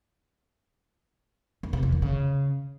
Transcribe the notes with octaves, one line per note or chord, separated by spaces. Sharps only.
E2
C3
E2
D#3
C#3